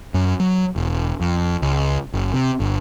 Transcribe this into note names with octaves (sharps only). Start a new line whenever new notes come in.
F#2
F#3
E1
F2
C#2
F#1
C3
G1